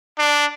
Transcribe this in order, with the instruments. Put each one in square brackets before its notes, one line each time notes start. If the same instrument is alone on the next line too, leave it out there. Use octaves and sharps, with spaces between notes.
[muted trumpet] D4